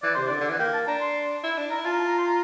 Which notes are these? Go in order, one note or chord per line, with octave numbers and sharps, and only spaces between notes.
E3 D5
C3 C5
D3 D5
D3
E3
A#3 G5
A5
D4 A#5
C6
E4
D4
E4 A#5
F4 A5
A#5
A5
A#5
C6
A#5